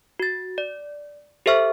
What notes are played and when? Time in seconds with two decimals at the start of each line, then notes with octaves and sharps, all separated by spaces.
0.20 F#4 A6
0.58 D5
1.46 G4 A4 C5 E5 C#6 F6